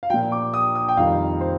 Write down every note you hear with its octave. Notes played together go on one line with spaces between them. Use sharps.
F5
A#2 F3 G5
D6
D#6
D#6
G5
F2 D#3 G3 F5
C5